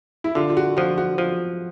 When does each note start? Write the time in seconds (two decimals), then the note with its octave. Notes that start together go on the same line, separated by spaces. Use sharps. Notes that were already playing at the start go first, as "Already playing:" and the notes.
0.24 E4
0.35 D3 F4
0.50 F4
0.57 F#4
0.77 F3 F#4
0.98 F#4
1.18 F3 F#4